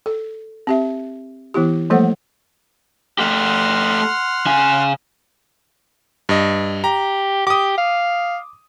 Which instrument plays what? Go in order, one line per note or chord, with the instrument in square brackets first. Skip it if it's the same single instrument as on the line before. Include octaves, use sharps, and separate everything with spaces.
[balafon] A4
C4 G4 E5
E3 B3 E4 G4
F3 G3 A3 A#3 A4 C5
[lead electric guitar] A3 G4 [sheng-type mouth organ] F#5 C6 F6
[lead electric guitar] C#3 G#5
[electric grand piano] G2 D#5
[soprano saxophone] G4 [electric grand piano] A#5
[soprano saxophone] G4 [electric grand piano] D6 D#6
[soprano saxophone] F5